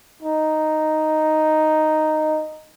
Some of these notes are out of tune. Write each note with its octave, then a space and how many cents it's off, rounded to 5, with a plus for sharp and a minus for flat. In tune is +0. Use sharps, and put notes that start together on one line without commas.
D#4 -5